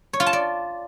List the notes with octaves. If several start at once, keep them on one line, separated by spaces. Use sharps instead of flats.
C#5
F4
A5
D5